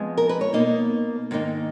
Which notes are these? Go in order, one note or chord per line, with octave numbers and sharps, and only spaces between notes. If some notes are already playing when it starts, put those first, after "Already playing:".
Already playing: F2 F3 G#3 B3 D#5
A#4
B4
C#5
B2 A#3 D#4 D#5
G#2 D#3 A#3 D#4